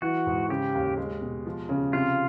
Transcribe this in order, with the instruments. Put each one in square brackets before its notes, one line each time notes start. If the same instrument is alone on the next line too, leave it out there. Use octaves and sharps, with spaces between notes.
[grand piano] E3 [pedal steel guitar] F#4
[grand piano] G#2
[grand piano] C#3 [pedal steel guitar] G4
[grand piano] D#2
G#3
B2
F3
C#3
[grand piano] C3 [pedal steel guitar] F4